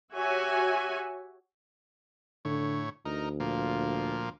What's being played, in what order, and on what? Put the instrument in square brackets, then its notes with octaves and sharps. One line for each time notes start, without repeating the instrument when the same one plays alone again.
[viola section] F#4 G4 C#5 E5 G#5
[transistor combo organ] A2 C#5 [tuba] D3
[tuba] D2 [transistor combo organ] D#4 A#4
[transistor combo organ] A#2 F3 A#3